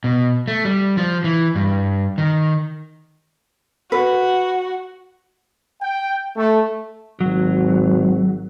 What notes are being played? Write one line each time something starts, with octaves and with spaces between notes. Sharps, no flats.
B2
A3
G3
F3
E3
G2
D#3
F#4 B4
G5
A3
G#1 F#3